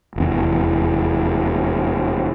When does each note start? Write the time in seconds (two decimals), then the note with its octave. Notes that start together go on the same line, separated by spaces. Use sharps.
0.16 F1 E2